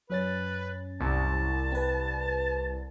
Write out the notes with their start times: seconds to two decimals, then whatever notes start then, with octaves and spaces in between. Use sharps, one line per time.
0.10 F#2 C#4 B4 A6
1.00 C2 A5
1.72 C4 B4